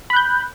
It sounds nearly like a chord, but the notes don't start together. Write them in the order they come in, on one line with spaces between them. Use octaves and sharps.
B5 F#6 G6